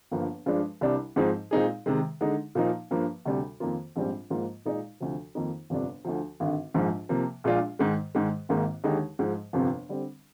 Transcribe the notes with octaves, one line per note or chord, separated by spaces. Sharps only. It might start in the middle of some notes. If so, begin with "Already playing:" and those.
G1 G2 F3 A#3
G2 F3 G#3 D4
C2 C3 G3 D4
G#2 F3 C4 D#4 G#4
A#2 G#3 C4 D#4 G#4
C3 D#3 G#3
D3 G#3 D#4
A#2 F3 A#3 D#4
G2 F3 A#3
D2 C3 G3
F2 D#3 A#3 F4
A#1 G#2 G3 C4
G#2 F3 A#3 F4 C5
A#2 G#3 D#4 G#4 D5
D2 C3 F3
F2 D#3 A#3 D#4
G1 F2 C3 G3 D4
D2 D3 F3
G#1 G2 D3
A#1 G#2 F3
C3 F3 A#3
A#1 A#2 G#3 D4 F4
G#2 D#3 G#3
G#2 D#3 G#3
G#1 G#2 D#3 A#3
D#2 D3 G#3 D#4 G4
G#2 F3 G#3
G1 F2 C3 F3 C4
D3 G3 C4